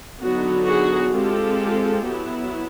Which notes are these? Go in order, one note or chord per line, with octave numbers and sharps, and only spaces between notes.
D3 F#3 B3 D#4 F#4
F#4 G#4
G#3 C4 F4 G4 A4
F#3 B3 E4